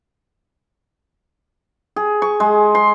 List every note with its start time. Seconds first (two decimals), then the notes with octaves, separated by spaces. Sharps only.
1.96 G#4
2.22 C#6
2.40 G#3
2.75 C6